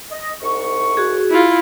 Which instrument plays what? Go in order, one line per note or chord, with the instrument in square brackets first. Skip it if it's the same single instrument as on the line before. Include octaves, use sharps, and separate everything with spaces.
[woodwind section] D#5
C2 G#2 C#6
[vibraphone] F#4 G#4
[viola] E4 F4